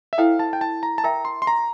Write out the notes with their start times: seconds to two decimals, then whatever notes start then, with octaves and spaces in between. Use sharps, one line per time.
0.13 E5
0.18 E4 A4 C5 F5 G5
0.39 A5
0.53 G5
0.61 A5
0.83 A#5
0.98 A5
1.04 A#4 E5 G5 A#5
1.25 C6
1.42 C6
1.47 A#5